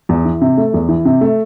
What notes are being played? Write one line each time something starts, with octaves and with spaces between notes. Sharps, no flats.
E2
E3
C3
A3
E2
E3
C3
A3